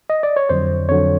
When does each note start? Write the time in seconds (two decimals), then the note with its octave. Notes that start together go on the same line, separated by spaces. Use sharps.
0.10 D#5
0.23 D5
0.36 C#5
0.49 F2 D3 F#3 C5
0.89 F2 D3 F#3 C#5